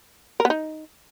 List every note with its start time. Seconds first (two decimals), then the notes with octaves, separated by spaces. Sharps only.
0.40 A#4
0.45 B3
0.50 D#4